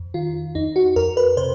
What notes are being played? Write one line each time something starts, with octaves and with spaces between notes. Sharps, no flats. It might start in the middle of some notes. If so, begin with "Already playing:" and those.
Already playing: F2
D#3 F4
F2 D#4
F#4
F2 A#4
B4
C3 C5